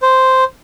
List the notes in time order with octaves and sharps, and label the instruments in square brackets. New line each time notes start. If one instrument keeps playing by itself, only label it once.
[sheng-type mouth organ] C5